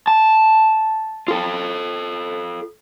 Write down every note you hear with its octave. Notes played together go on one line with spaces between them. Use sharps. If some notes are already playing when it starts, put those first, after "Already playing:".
A5
F4 A4